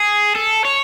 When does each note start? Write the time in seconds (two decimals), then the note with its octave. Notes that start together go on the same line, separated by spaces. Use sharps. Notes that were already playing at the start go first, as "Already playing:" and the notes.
Already playing: G#4
0.35 A4
0.65 C#5